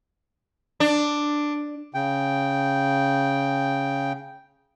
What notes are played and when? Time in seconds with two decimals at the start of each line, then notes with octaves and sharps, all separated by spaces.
0.80 D4
1.94 C#3 G5